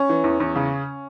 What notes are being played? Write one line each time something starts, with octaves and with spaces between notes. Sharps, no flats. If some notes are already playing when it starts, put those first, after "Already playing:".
Already playing: C#4
E3
E2
E2
C#3